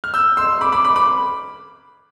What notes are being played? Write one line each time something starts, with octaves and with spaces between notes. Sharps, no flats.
F6
E6 G6
C6 E6
B5 D6
B5 D6
B5 D6
B5 D6